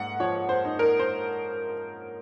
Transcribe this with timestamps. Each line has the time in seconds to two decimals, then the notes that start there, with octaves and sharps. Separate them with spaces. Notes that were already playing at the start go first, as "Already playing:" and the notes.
Already playing: G#2 A#3 F#5
0.20 F3 C#5
0.49 C5
0.65 D#4
0.79 A#4
1.00 C5